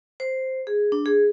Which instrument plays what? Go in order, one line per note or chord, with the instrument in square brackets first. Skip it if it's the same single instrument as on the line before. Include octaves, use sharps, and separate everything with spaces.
[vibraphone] C5
G#4
D4
G#4